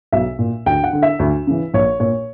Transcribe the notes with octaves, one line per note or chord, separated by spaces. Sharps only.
B1 E5
A#2
D2 G5
F#5
D3
E5
D2
C#3 E3
A#1 C#5
A#2 C#5